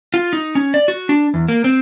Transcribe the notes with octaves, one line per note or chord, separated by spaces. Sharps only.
F4
D#4
C#4
D5
F#4
D4
E2
A#3
C4